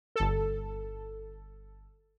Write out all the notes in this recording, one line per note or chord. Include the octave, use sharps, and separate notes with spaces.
G1 A4